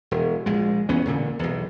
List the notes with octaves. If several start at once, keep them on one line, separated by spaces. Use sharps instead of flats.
E1
A#1 G#3
E2 B3 C#4
E1 A#2 D3
B1 E2